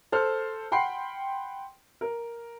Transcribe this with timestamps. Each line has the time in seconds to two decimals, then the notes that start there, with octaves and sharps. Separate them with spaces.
0.12 A4 C5 F6
0.72 F#5 G5 B5 C6 C7
2.01 A#4